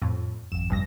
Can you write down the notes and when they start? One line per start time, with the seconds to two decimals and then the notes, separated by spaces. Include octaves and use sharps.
0.02 F2 A2
0.52 G#1 F2 E7
0.70 B1 G2 A#6